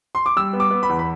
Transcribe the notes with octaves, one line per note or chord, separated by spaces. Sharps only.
C6
D6
G3 E6
B3
D6
B3
B5
E2
B5